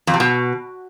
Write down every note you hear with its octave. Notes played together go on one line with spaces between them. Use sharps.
F2
C3
B2